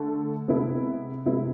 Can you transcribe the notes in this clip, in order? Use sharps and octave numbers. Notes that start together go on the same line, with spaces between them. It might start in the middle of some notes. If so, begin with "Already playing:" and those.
Already playing: D3 A3 A4
C3 G#3 B3 E4
C3 G#3 B3 E4